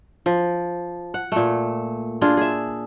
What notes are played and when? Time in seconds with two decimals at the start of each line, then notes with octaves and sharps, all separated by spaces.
0.26 F3
1.14 F#5
1.32 A#2 A3
2.21 D4 F4 G#4
2.37 G#4 E5